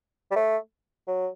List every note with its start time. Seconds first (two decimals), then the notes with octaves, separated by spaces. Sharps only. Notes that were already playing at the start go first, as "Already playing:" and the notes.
0.31 G3
0.36 A3
1.07 F#3